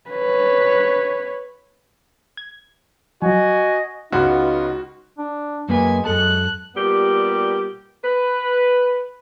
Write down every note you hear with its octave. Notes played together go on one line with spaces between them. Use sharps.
B4 C#5
G#6
F3 F#3 F#4 D#5 G#5
C#2 B3 D#4 F4 F#4
D4
F#2 G#3 A#3 B4 G#5
F#2 A4 A5 F#6
A#2 G3 B3 G4
B4